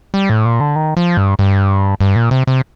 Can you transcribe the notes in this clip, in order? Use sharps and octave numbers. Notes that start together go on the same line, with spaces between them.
G3
A2
A#2
D3
D#3
F3
G2
G2
G2
A#2
C3
C3